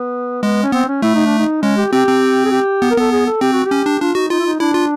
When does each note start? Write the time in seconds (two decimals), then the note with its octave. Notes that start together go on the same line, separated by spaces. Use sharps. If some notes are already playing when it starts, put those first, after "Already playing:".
Already playing: B3
0.43 G#3 B3
0.63 C#4
0.72 B3 C4
0.88 C#4
1.02 A3 E4
1.15 D#4
1.26 D4
1.38 D#4
1.62 G#3 C#4
1.77 G4
1.92 C4 G4
2.07 C4
2.45 G#4
2.51 G4
2.82 B3
2.91 A#4
2.97 B3 A4
3.11 G#4
3.27 A4
3.41 C4 G4
3.53 F#4
3.65 G4
3.71 C#4
3.86 D4
4.01 D4 F4
4.15 D#4 F#4
4.30 D#4 F4
4.39 E4
4.46 D#4
4.60 D4 E4
4.74 F4